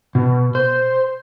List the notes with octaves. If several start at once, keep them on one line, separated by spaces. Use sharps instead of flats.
B2
C5